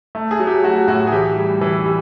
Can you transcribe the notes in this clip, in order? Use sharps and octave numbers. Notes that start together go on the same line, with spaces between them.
A3
G#4
F#3
G4
A3 F#4
A2 F#4
G#4
E3 G4
G3
E3
G3